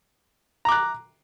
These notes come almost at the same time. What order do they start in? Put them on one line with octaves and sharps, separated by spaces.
A#5 D6 F#6